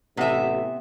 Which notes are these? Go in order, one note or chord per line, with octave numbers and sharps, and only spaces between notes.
A1 C3 B3 E5 G#5